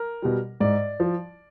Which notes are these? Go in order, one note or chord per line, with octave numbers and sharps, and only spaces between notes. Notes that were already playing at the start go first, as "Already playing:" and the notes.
Already playing: A#4
B2 G3
G#2 D5
F3